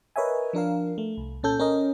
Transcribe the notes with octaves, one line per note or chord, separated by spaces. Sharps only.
A#4 B4 C#5 D#5 E5 G#5
F3 D4 A#4 F5
A3
C2
A#2 C#4 A4 G6
C#4 A#4 D#5